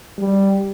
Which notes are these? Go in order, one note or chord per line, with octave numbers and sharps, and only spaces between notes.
G3